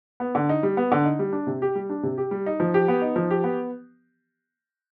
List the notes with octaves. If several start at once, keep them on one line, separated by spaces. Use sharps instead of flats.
B3
D3
D#4
G3
B3
D3
D#4
G3
D4
C3
G4
G3
D4
C3
G4
G3
D#4
F3
G4
B3
D#4
F3
G4
B3